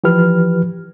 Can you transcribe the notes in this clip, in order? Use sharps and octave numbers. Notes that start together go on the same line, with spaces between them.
E3 F3 G4 B4 F6